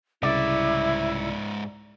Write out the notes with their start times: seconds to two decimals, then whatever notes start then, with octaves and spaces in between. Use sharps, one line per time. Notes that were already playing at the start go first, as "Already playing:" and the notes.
0.23 C2 G#2 C#3 E4 D5 E5